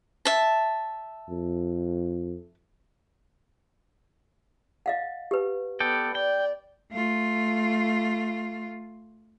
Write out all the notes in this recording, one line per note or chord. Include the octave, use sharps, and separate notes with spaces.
E5 A5
F2
D#5 F5 F#5
G4 B4
B3 A4 D5 G5
D5 G5
A3 F4